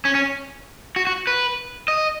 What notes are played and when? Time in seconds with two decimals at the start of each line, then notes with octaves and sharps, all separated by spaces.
0.05 C#4
0.15 C#4
0.96 F#4
1.07 F#4
1.27 B4
1.88 D#5